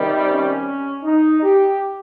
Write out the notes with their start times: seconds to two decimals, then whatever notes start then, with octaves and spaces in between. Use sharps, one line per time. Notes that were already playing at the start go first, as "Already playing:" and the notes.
Already playing: C3 D#3 G3
0.26 C#4
1.04 D#4
1.43 G4